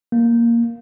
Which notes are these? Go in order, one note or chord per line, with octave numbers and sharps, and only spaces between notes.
A#3